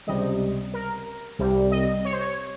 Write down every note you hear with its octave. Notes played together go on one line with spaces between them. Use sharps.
C#2 C3 G3 D#5
A#4
C2 C3 G3
D#5
C#5
C5
C#5